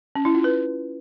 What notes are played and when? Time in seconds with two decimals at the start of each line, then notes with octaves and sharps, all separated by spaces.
0.16 C#4
0.25 E4
0.35 F4
0.44 B4